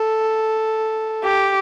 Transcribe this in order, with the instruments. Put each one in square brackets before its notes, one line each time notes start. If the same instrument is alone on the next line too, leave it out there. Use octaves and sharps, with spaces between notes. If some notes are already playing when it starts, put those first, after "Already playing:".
Already playing: [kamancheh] A4
G4